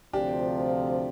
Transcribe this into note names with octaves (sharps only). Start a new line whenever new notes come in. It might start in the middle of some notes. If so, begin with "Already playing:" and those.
D2 C3 F3 C4 D4 F4 G4